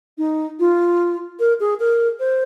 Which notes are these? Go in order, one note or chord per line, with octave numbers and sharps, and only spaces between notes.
D#4
F4
A#4
G#4
A#4
C5